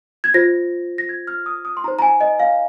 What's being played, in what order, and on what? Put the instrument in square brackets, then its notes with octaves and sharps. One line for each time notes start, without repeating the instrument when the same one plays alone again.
[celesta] G#6
F4 C5 A#6
A#6
G#6
F6
D#6
D#6
C6
D#4 C5 A#5
A#5
G#5
D#5
F5